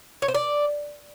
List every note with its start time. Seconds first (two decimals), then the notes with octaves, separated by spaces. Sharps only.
0.22 C#5
0.28 C5
0.35 D5